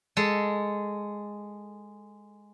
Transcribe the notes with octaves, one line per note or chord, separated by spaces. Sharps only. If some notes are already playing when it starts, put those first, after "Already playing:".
G#3 A4